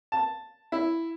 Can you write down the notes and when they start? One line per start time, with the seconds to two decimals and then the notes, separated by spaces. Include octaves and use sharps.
0.12 A5
0.72 E4